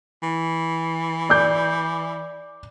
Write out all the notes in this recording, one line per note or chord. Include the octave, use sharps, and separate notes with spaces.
E3
D5 D6 G6